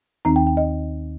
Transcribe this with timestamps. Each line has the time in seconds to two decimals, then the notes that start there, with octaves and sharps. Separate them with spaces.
0.25 D#2 D#3 C4 D#4 A#5
0.36 G5
0.47 G5
0.57 D#5